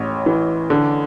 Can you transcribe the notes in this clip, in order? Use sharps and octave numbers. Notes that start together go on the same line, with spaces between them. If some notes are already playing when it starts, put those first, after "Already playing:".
Already playing: A1 C#5
E3
D3